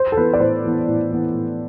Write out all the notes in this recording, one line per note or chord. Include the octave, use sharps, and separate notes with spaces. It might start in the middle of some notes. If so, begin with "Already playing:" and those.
Already playing: C5
A4
E3 B3 B4
D5
A2 C5
E3 B3
A2
E3 B3
A2